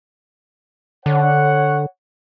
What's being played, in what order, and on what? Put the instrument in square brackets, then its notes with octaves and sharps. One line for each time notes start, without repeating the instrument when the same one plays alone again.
[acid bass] D3 [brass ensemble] C#5 F#5